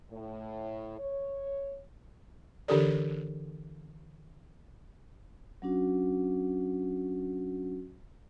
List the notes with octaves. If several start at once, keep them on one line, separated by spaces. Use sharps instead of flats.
A2
C#5
D3 E3 D4 G4 A4 D5
F#3 C#4 D4 F#4